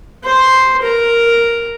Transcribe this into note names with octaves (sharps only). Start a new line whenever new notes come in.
C5 C6
A#4 A#5